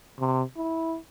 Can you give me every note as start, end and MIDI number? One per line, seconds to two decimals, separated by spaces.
0.19 0.43 48
0.57 0.97 64